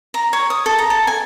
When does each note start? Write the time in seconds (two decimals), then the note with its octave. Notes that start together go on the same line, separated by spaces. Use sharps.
0.14 A#5
0.33 C#5
0.50 D#6
0.66 A4
0.78 A#5
0.90 A4
1.07 G#5